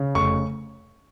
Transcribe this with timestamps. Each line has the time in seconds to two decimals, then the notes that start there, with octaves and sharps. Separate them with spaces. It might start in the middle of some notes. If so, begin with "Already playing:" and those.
Already playing: C#3
0.15 F1 C#6